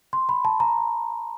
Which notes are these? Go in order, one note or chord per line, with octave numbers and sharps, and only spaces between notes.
C6
B5
A5
A#5